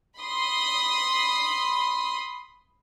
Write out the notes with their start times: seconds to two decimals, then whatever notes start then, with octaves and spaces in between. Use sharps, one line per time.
0.19 B5 C6 D#6